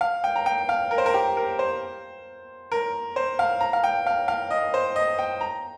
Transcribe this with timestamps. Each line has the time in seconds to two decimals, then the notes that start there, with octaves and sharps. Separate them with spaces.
0.01 F5
0.24 G5
0.36 A#5
0.46 G5
0.69 F5
0.91 A#4
0.98 C5
1.06 A#4
1.14 G4
1.37 A#4
1.59 C5
2.72 A#4
3.16 C5
3.39 F5
3.61 A#5
3.73 F5
3.84 G5
4.07 F5
4.28 F5
4.50 D#5
4.74 C5
4.96 D#5
5.19 G5
5.41 A#5